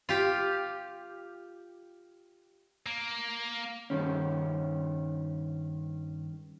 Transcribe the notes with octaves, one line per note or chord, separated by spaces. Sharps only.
F4 G4
A#3
G2 D#3 C#4